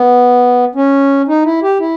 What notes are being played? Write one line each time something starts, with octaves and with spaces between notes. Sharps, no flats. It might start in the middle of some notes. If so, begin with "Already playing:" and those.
Already playing: B3
C#4
D#4
E4
G4
E4